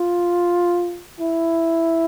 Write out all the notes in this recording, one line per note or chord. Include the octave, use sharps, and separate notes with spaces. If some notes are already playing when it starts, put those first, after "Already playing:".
Already playing: F4
E4